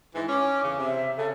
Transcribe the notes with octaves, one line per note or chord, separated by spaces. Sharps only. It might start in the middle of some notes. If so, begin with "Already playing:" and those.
G#2 E3
C#4 D6
E2 C#3
C3 E5
C#3 A4